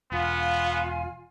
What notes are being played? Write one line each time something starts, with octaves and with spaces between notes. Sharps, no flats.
E1 B3 F4 F5 G#5